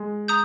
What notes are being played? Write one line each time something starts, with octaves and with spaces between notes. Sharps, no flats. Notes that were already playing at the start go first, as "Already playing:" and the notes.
Already playing: G#3
A#5 D#6 G6